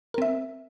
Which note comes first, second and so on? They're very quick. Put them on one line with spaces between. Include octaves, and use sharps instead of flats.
A#4 C4 E5